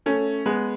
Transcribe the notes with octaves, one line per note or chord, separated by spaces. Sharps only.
A3 C#4
G#3 B3